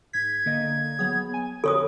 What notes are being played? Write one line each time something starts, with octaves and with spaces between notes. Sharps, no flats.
G#2 G#6 B6
D3 A#3 D#5
F#3 B3 G#4
G#5
F2 D3 F#4 A4 C#5 D#6